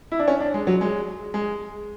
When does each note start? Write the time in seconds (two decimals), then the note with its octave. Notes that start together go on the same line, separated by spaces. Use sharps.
0.12 E4
0.19 D4
0.28 C#4
0.40 D4
0.54 G#3
0.67 F#3
0.81 G#3
1.34 G#3